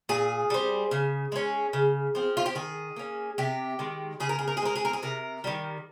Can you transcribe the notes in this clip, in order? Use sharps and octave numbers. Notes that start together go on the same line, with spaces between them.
A#2 G#4
G3 C4
C#3
G#3 C#4
C#3
F3 C4
F4
G4
D#3 G#4
A#3 C#4
C3 G4
D#3 G#3
C#3 G#4
A#4
G#4
A#4
G#4
G#3 C4 A#4
G#4
A#4
G#4
C3 A#4
D#3 G3